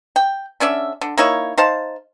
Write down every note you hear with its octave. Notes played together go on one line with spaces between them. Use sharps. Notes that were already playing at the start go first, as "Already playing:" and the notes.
G5
D3 C#4 D5 E5
D3
A#3 D#4 E4 C#5
D#4 C5 F5 A5